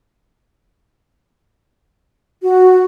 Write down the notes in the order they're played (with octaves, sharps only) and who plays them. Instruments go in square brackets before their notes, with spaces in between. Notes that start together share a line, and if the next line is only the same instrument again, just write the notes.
[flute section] F#4